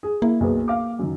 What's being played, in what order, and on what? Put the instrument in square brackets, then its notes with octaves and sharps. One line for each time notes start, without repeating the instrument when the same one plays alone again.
[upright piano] G#4
[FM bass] A#3 [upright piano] E4
[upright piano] B1 G#4 B4
F5 D6
F#2 D#3